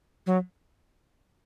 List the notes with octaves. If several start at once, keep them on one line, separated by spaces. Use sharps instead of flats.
F#3